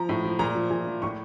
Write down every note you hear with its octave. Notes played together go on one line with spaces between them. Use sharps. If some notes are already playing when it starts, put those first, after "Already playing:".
Already playing: F3 A#5
A2
F3
A#2 A#5
F3
A#2
F3
A2 C#6